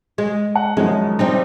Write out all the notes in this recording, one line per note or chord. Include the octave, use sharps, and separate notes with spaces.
G#3
F#5
F#2 D#3 F3 G#3
G3 C4 D#4